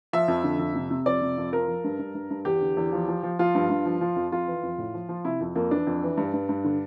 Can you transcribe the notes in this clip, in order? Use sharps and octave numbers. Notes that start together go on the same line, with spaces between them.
F3 E5
F2
D3
F2
C3
C3
F2 D5
C3
F2
F3 A#4
F3
G2
G2
G2
G2
E2 G4
D3
E2
F3
F3
F3
F3 F4
G2
G2
F3
F3
F2
F2 F4
E3
F2
A2
F3
F3
C3 E4
F2
F2 A#3
E3 D4
F2
E3
G2
G2
G2
D3